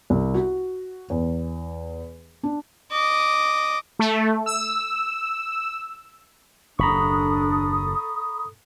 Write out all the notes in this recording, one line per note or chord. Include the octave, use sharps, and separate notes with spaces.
C2
F#4
E2
D4
D#5 D6
A3
E6
F#1 D#2 D4 A4 A#5 B5 C#6 D#6